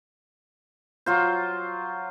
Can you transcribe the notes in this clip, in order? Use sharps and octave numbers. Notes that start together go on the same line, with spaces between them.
F#3 F4 C5